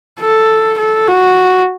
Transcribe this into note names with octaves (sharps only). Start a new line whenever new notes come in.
A4
A4
F#4